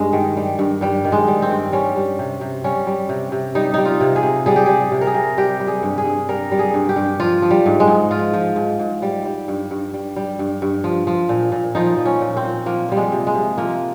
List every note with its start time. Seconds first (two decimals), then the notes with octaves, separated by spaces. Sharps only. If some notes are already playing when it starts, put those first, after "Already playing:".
Already playing: G2 G#3
0.13 D#3
0.37 G3
0.59 G2
0.81 G2 G3
1.05 D#3
1.12 G#3
1.28 G3
1.42 C4
1.50 G2
1.72 G3 C#4
1.96 G3
2.19 C3
2.41 C3
2.64 G3 C#4
2.87 G3
3.09 C3
3.32 C3
3.55 G3 D#4
3.74 G3 D#4
3.85 F4
4.01 C3
4.16 G#4
4.23 C3
4.46 G3 G#4
4.56 G4
4.66 G3 G#4
4.92 C3
5.01 A#4
5.07 G#4
5.14 C3
5.38 G3 G4
5.60 G3
5.67 G#4
5.83 G2
5.98 G#4
6.05 G2
6.28 G3 A#4
6.52 G3
6.59 G#4
6.74 G2
6.89 G4
6.96 G2
7.20 F3 F4
7.42 F3
7.51 G3
7.66 G#2
7.80 G#3
7.87 G#2
8.11 F3 F4
8.34 F3
8.56 G#2
8.80 G#2
9.02 G3
9.25 G3
9.48 G2
9.71 G2
9.93 G3
10.16 G3
10.39 G2
10.62 G2
10.84 F3
11.07 F3
11.29 A#2
11.52 A#2
11.75 F3 D#4
11.98 F3
12.05 C#4
12.21 A#2
12.37 C4
12.43 A#2
12.66 F3 A#3
12.89 F3 G3
12.97 G#3
13.12 C3
13.27 G#3
13.35 C3
13.58 F3 A#3